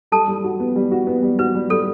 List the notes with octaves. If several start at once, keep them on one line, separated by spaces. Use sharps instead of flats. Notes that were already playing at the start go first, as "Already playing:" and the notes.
G3 A4 A5
G3
F#4
B3
G3
F#4
B3
G3
F#4 B4
G3
G3 A4